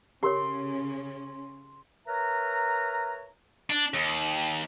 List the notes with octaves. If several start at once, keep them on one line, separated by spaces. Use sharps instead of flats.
C#3 C#4 G4 A#4 C#5 C6
A#4 B4 C#5 E5 A#5
D4
D#2